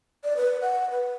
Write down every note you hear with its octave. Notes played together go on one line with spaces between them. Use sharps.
D5
B4
F#5
B4